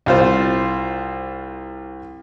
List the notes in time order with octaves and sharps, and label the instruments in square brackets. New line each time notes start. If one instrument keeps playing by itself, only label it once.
[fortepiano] C2 F4 C5